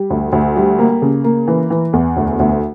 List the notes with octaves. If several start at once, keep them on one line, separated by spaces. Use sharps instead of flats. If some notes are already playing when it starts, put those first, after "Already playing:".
Already playing: G3
D2
D2
G3
A#3
C#3
A#3
E3
E3
E2
D2
D2